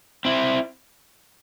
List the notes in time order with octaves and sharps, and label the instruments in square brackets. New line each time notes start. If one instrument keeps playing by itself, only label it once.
[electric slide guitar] C4 E4